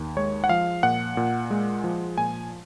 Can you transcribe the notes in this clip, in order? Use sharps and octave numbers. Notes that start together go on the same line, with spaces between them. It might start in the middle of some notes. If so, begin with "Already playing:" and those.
Already playing: D#2
G#3 C#5
F#5
F3 F5
A#2 F#5
A#2
G#3
F3
A#2 G#5